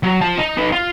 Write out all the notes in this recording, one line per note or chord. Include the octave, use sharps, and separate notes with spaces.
F#3
F3 A5
D#4
D#4 B4
F4